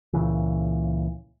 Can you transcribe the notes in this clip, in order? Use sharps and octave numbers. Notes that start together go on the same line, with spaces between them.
C#2 A#2 C#3 E3